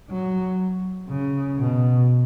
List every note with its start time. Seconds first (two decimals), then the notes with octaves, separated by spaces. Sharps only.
0.10 F#3
1.08 C#3
1.58 B2